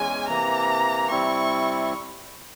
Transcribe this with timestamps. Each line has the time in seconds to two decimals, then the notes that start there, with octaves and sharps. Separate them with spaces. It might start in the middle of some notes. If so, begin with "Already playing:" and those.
Already playing: E2 G#3 C#4 G#5
0.28 C3 E3 A#3 A#5
1.11 C3 G3 C4 E4 C#6